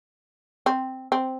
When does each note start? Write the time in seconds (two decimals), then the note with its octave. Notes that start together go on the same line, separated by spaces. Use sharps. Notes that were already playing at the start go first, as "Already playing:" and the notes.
0.66 C4
1.12 C4